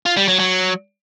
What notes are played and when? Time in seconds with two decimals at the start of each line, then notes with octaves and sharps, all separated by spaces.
0.06 F4
0.17 G3
0.28 F#3
0.39 F#3